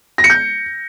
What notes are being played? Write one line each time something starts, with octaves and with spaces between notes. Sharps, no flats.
A#6
C#7
G6